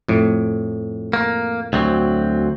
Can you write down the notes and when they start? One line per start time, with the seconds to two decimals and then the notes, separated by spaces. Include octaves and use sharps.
0.09 F2 A2
1.13 A#3
1.73 D2 F#3 C4